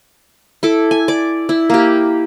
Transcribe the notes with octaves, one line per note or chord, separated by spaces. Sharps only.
E4 A4 D6
G#5
D5 D6
E4
A#3 G4